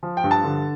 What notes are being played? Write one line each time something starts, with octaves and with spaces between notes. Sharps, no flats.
F3
G5
G2
A5
D3